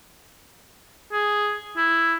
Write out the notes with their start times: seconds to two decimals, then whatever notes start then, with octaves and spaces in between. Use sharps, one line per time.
1.12 G#4
1.77 E4